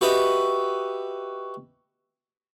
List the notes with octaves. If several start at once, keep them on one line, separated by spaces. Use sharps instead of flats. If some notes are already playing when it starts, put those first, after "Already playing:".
F#4 G4 B4 D#5 E5